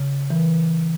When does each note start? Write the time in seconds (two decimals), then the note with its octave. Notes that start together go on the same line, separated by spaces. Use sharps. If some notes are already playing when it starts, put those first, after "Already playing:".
Already playing: C#3
0.30 E3